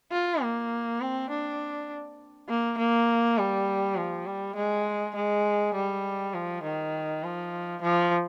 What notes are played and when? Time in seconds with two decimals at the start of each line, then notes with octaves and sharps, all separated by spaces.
0.12 F4
0.42 A#3
1.00 C4
1.30 D4
2.48 A#3
2.78 A#3
3.38 G3
3.97 F3
4.26 G3
4.55 G#3
5.15 G#3
5.74 G3
6.34 F3
6.63 D#3
7.23 F3
7.82 F3